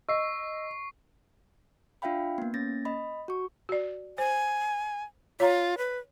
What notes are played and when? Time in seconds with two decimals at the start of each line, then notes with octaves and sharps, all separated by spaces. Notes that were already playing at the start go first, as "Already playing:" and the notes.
0.09 D#5 C#6 E6 C7
2.02 D4 F4 E5 F5 G5 B5
2.38 A#3 B3
2.54 A#3 C#4 A6 A#6
2.85 D#5 B5
3.28 F#4 C#6
3.69 F#4 D5
4.18 C5 G#5
5.40 F4 C#5 A#5
5.78 B4